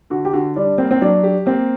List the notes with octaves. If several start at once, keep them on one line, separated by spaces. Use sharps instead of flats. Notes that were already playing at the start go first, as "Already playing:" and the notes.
D3 F#4
G4
D3 F#4
G3 D4
A#3 C4
C4
F#3 D4
G4
A#3 C4